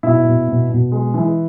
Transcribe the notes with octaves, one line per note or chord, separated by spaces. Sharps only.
B2 E4
B2
B2
B2
G#3
E3